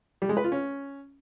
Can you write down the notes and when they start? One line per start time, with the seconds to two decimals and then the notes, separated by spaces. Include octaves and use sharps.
0.22 G3
0.29 G#3
0.37 B4
0.44 F4
0.52 C#4